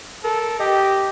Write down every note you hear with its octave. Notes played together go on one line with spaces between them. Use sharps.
A4 A#4
G4 D#5